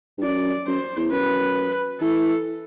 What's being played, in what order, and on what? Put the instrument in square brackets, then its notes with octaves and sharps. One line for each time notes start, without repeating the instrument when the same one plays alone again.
[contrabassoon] G2
[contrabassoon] F#2 [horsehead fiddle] D5
[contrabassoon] F#2 [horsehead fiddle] C5
[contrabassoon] E2
[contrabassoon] F#2 [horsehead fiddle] B4
[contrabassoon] E3 [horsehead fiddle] A4